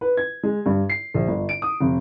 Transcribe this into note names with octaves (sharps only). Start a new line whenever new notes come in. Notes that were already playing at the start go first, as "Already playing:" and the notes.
B4
G#6
G#3
G2
C7
A#1
G1
D7
D#6
F1